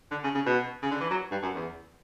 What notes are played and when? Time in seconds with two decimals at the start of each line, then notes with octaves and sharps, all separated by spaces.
0.11 D3
0.24 C#3
0.35 C#3
0.46 B2
0.83 C#3
0.91 D3
1.00 E3
1.10 F#3
1.31 G2
1.42 F#2
1.55 E2